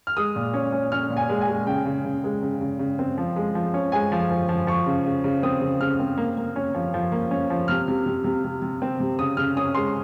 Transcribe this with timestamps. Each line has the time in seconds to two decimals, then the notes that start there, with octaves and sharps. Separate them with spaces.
0.07 F6
0.16 G#3 D#6
0.36 A#2
0.54 C#4
0.72 C#4
0.92 C#4 F6
1.10 A#2
1.17 G#5
1.29 G#3
1.41 G#5
1.48 G#3
1.66 C#3 G5
1.85 C#3
2.04 C#3
2.24 G#3
2.43 C#3
2.61 C#3
2.79 C#3
2.99 C4
3.18 F3
3.36 G#3
3.55 F3
3.74 C#4
3.92 G#3 G#5
4.12 F3
4.30 F3
4.49 F3
4.67 F3 C#6
4.86 C#3
5.06 C#3
5.24 C#3
5.43 C4 D#6
5.61 C#3
5.81 C#3 F6
5.99 C4
6.17 A#3
6.37 A#3
6.56 C#4
6.74 F3
6.94 F3
7.12 A#3
7.31 C#4
7.50 F3
7.68 C3 F6
7.88 C3
8.06 C3
8.24 C3
8.44 C3
8.62 C3
8.82 C4
9.00 C3
9.19 C#3 D#6
9.37 C#3 F6
9.57 C#4 D#6
9.75 G#3 C6